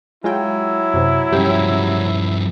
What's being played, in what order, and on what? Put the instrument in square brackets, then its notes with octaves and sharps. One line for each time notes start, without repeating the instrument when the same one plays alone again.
[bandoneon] F#3 [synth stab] G#3 F4 G5 [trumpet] E4
[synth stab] F#2 C3
[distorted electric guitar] G2 F3 [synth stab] C#4 G4